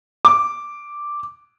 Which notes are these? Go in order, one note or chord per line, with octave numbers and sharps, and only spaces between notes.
D6